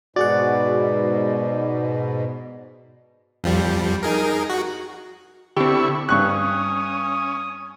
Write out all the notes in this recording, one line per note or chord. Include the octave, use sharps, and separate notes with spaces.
G#2 B2 F#4 G#4 D5 F#5
F2 F3 G3
D#4 G#4 A#4
F#4
D3 C4 E4 G4 C#6
G2 C#4 C#6 D#6 F#6